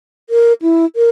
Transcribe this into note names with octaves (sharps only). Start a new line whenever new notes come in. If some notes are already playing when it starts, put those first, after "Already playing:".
A#4
E4
A#4